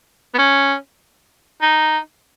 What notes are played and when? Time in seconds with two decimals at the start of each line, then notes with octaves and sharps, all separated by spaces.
0.34 B3
0.38 C#4
1.62 D#4